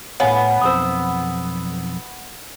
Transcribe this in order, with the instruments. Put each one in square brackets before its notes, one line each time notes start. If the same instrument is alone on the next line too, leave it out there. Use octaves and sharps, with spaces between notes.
[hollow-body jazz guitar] A2 F5 [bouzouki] B3 [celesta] C#5 G#5
[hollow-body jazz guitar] B1 F2 C5 [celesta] D#6 E6